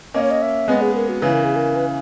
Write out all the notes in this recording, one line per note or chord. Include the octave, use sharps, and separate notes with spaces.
A#3 C#4 D#5
C#5
D#5
E5
G#3 B3 D#5
G#4
A#4
F#4
C#3 E3 B4
A#4
G#4
A#4
B4